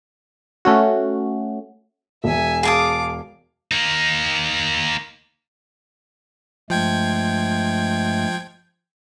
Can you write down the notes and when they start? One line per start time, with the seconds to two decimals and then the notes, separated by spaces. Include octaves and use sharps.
0.65 A3 C#4 F#4
2.24 E1 E5 G#5
2.63 G#4 F5 A5 D6 D#6
3.71 A#3 D#4
6.70 G2 F3 G#3 A3 G5 G#6